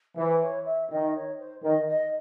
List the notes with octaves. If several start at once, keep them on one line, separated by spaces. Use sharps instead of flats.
E3 C5
C#5
E5
D#3 D#5
C#5
C5
D#3 D#5
D#5